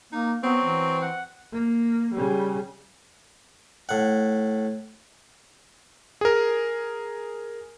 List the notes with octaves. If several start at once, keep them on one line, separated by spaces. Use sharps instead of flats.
A#3 D#4
F#3 B3 C4
E3
F#5
A#3
C#3 G3
A2 F#5
G#4 A#4